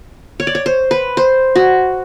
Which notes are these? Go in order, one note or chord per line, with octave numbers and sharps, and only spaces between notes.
C#5
D5
C#5
C5
B4
C5
F#4